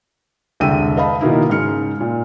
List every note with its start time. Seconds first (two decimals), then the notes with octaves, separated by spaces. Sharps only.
0.60 E1 C2 D3 G5 E6 D#7
0.97 B4 D#5 F5 A5 B5
1.21 B2 D#3 A#3 D#4 E4
1.49 G#2 C#3 F6 C#7
2.00 A#2